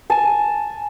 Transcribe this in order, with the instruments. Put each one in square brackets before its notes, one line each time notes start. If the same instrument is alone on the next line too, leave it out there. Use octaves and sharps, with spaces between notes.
[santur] G#5 A5